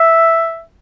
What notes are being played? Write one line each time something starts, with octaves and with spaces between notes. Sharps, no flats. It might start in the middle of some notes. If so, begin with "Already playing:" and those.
Already playing: E5